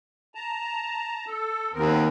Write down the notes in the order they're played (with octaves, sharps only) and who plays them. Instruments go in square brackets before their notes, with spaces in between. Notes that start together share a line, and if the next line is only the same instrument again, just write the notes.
[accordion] A5 A#5
A4
[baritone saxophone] D#2 [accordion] B3 C4 A#4